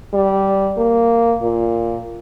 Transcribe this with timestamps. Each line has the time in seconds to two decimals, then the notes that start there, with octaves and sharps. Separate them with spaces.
0.14 G3
0.78 A#3
1.41 A#2